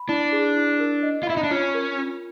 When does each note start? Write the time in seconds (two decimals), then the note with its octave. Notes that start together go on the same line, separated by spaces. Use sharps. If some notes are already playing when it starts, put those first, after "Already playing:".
Already playing: B5
0.08 D4 E4
0.32 G#4
0.56 E4
0.80 A#4
1.03 D#5
1.23 F4
1.27 E4 B5
1.37 D#4
1.44 D4
1.51 C#4 F4
1.74 A#4
1.98 F4